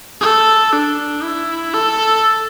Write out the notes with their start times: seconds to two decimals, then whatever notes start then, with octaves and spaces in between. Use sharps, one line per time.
0.21 A4
0.73 D4
1.23 E4
1.74 A4